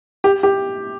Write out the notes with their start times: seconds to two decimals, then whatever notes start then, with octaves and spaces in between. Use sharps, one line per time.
0.24 G4
0.43 G4